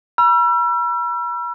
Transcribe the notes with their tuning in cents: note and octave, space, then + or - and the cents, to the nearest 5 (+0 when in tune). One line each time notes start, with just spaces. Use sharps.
B5 -40 E6 +35